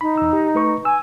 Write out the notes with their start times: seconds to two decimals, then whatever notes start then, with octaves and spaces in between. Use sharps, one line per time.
0.01 D#4 B5
0.17 E2 E6
0.33 G4
0.55 A3 B4 C#6
0.85 G#5 E6